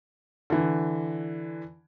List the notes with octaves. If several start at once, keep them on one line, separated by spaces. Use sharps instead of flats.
D3 E3